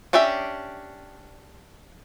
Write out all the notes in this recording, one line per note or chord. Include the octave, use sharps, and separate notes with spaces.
C#4 D4 G4 E5 G5